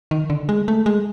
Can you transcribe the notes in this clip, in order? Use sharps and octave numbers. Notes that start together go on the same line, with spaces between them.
D#3
D3
G#3
A3
G#3